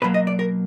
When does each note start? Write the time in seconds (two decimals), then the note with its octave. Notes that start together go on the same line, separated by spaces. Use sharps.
0.02 B2 F#3 A#3 B4
0.14 D#5
0.27 D5
0.39 A#4